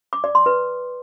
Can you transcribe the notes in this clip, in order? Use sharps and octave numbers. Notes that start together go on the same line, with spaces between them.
D6
D5
C6
B4